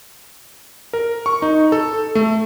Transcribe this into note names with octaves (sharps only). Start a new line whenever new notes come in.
A#4
C#6
D#4
A4
A3